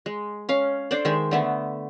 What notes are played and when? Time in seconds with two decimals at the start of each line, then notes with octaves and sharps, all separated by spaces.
0.06 G#3
0.49 C#4 F5
0.91 D4 A4 C5 D5
1.05 D#3 G#3 E5
1.31 D3 A3 B3